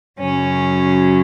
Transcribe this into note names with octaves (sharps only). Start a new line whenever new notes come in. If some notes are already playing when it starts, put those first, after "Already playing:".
F#2 C#3 F#3 C#4